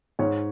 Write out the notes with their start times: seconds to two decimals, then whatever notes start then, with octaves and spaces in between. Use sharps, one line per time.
0.19 G#2 C#5